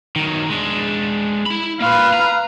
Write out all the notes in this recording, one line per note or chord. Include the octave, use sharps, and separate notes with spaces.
D#3 F#3
G#3 D4
E4 B5
A#3 F4 B4 F5
A#5